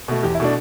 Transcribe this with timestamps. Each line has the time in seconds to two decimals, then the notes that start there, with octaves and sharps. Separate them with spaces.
0.08 B2 A3
0.23 E2 G4
0.35 E4
0.40 B2 A3 D4